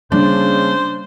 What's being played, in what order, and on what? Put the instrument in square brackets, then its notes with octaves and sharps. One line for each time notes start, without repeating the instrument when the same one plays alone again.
[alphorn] C#3 [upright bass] G3 A#3 [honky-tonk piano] D4 [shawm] C5